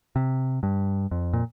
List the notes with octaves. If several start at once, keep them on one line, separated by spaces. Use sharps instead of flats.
C3
G2
F2
A#2